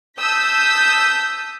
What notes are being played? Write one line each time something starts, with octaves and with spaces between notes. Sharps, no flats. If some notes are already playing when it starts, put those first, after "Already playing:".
A5 D#6 E6 G6 B6